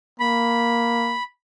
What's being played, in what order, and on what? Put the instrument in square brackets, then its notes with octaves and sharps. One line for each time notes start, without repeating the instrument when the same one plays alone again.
[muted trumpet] A#3 [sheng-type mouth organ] B5